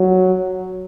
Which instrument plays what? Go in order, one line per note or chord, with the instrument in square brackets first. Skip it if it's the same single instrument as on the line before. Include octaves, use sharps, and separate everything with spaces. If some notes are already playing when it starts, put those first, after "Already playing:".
Already playing: [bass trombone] F#3